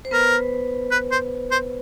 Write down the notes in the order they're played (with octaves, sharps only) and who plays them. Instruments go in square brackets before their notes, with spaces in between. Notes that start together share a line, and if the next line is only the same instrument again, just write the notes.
[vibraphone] C5
[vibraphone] B3 B4 [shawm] A#4
[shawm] B4
C5
C5